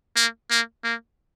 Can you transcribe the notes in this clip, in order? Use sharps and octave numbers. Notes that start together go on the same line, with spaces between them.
A#3
A#3
A#3